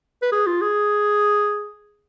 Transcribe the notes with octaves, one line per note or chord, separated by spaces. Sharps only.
B4
G#4
F4
G#4